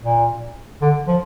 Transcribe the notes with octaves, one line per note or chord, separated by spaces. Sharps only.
A#2
D3
F3